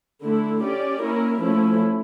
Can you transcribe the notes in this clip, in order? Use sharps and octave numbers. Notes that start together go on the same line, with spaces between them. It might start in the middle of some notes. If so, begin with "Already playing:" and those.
D3 A3 E4
C#4 G4 D5
A#3 C#4 E4 A#4
F3 A3 C#4 E4